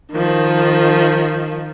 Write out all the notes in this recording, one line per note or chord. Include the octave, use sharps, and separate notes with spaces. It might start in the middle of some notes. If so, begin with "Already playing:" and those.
D#3 F3